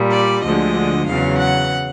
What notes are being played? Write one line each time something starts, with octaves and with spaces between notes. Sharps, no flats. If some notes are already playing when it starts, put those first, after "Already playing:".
Already playing: A#2 G3
D5
D2 D3 F3 G#3 D#5
E2 C#3 F#3 F5
F#5